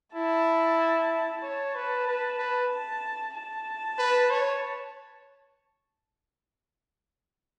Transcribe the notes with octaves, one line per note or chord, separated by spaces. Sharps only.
E4 A5
C#5 A5
B4
B4
B4
A5
A5
B4
C#5